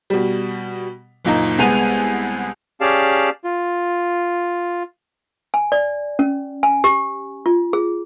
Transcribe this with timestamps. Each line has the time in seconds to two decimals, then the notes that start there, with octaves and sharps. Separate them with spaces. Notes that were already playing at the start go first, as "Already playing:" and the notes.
0.10 B2 G3
1.25 F#1 A#2 A#3 D#4
1.58 C2 G#3 B3 G#5 D#7 F7
2.81 C#4 G4 G#4 D5 F5 A5
3.44 F4
5.54 G#5
5.72 D5
6.19 C#4
6.63 G#5
6.84 G4
7.46 F4
7.73 G#4